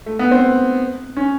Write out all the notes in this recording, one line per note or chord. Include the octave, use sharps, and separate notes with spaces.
A3
B3
C4
C#4